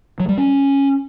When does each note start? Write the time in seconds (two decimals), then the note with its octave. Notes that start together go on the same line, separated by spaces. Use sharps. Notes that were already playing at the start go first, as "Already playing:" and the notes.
0.20 F#3
0.29 G3
0.38 C#4